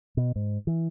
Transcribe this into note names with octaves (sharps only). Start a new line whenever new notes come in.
B2
G#2
E3